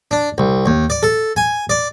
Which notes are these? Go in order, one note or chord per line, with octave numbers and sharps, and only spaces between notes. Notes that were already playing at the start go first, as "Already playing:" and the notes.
D4
C2
D#2
D5
A4
G#5
D5